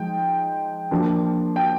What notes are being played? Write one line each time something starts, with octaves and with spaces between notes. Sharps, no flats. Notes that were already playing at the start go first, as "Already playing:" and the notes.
Already playing: F3 G#3 D#4 G5
F3 A#3 D4
G5